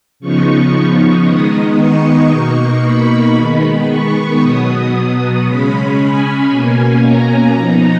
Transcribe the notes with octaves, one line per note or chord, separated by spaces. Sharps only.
C#3 F3 B3 D#4 C#6
D#3 G#3 B3 D#4 D#6
C#6
B2 A#3 D#4
B5
D#3 G#3 B3
C#6
B2 F#3 B3 D#6
C#3 G#3 C#4 B5
G#5
B2 A#3 C#4 G#5
A#5
F3 B3 D#4